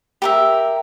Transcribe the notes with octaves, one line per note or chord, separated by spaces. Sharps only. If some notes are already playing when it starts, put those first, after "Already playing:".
G4 A#4 E5